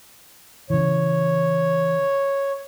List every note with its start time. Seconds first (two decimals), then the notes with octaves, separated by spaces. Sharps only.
0.70 C#3 E3 C#5